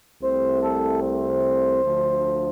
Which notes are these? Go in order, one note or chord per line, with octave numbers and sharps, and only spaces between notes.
C2 C3 A3 C4 C5
A4
C5
D2 D3 F3 A3